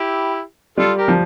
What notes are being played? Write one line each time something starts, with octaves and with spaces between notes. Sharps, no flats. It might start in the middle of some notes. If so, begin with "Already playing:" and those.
Already playing: E4 G4
G3 F4 A4
G4 A#4
F3